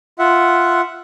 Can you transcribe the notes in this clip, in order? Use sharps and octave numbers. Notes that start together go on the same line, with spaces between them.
F4 E5 F#5